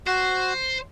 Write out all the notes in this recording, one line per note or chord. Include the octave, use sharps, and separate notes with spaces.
F#4 C5